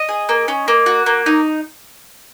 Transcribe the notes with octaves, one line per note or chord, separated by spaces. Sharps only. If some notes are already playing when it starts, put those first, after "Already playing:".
Already playing: D#5
G#4
A#3
C#4
A#3
F#4
A#3
D#4